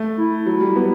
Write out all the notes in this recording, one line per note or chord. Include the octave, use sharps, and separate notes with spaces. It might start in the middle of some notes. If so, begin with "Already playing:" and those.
Already playing: A3
E4
F#3
G3
B3